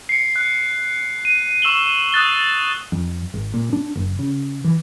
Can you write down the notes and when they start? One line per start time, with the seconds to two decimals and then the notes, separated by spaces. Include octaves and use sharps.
0.09 C7 C#7
0.36 F#6
1.25 D#7
1.62 C#6 E6 E7 F#7 G7
2.12 D#6 F#6 A6 G7
2.92 F2
3.34 G#1
3.54 A#2
3.73 D4
3.95 F#1
4.19 C#3
4.64 E3